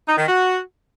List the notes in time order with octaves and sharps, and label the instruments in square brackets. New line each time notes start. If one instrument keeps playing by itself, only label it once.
[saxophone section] D#4
D#3
F#4